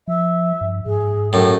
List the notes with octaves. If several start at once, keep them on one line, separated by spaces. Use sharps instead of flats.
F3 E5
G2
G#2 G#4
F#2 A2 G5